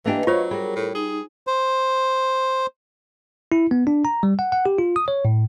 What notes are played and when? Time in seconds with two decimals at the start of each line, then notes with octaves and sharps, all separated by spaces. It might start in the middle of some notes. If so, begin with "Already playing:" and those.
0.06 E3 A#3 D4 G4 B4 D#5 F5
0.27 F#3 F4 C5 C#5
0.51 G3 G#4 A#4
0.76 A2
0.95 D#4 G#4
1.47 C5
3.52 E4
3.71 B3
3.87 D4
4.05 A#5
4.23 G3
4.39 F#5
4.52 F#5
4.66 G4
4.78 F4
4.96 D#6
5.08 C#5
5.25 A2